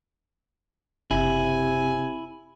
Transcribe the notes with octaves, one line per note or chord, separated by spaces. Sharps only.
F#1 C3 E4 G#5